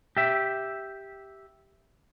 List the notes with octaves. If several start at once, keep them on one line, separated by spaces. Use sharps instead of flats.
G4 E5